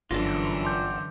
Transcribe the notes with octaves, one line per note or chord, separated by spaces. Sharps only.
G1 F#2 D3 E3 D4 F4 A#6
C6 D6 G6